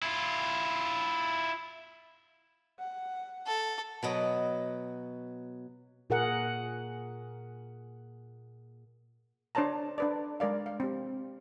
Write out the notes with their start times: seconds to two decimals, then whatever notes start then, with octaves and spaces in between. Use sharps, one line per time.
0.02 E4 F4
2.79 F#5
3.47 A4
4.03 B2 F#3 D#5
6.10 A#2 G#4 A#4 F#5
9.55 D4 C5 C#5 A5 A#5
9.98 D4 B4 D5
10.40 G#3 A#4 D5 F5
10.66 F5
10.80 C4 G4